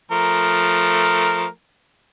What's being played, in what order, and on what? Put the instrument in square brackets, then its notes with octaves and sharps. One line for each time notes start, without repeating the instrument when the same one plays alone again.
[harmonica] F3 A3 A#4